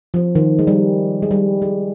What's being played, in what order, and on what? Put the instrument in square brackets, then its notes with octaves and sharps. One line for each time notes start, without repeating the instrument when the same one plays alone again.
[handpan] F3
D#3
G#3
G3
G#3
G3
G#3